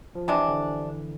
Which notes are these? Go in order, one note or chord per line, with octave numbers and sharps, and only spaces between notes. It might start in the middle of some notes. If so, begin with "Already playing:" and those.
F3
C3 E3 G#3 D4
D3